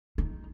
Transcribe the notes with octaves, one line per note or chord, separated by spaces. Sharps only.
D#4